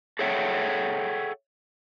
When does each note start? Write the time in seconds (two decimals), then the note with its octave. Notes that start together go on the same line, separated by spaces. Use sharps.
0.19 G#4 A4 C#5 E5 F#5 G5